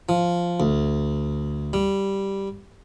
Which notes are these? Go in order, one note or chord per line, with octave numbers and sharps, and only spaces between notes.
F3
D2
G3